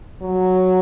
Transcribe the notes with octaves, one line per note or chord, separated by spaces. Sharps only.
F#3